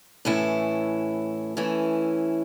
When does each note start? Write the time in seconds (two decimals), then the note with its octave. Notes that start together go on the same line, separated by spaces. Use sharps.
0.25 A2 E3 A3 C#4 E4
1.57 E3 A3 C#4 E4